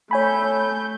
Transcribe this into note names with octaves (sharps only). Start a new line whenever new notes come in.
A3 C#5 G#5 B5 G6